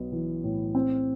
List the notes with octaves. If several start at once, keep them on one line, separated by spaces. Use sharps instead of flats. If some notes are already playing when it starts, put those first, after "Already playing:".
Already playing: B1 B3
E3
A2
C4